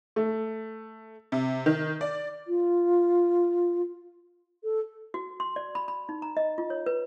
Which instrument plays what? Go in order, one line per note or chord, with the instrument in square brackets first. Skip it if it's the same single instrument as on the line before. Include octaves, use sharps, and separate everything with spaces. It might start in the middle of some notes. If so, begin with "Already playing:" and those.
[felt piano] A3
[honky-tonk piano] C3
D#3
D5
[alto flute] F4
A4
[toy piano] F#4
C6
D5
B5
B5
D#4
A#5
D#5
F4
C#5
B4